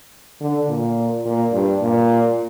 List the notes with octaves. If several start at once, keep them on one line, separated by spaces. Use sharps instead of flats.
D3
A#2
A#2
G2
A#2